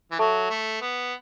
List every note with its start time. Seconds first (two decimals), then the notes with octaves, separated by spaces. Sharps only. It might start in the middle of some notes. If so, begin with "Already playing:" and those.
0.11 E3
0.19 F#3 A4 E5 A5 C#6
0.50 A3
0.81 B3